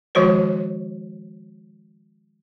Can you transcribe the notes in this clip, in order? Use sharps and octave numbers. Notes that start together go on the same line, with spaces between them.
D#3 F3 G#3 F#4 C5 C#5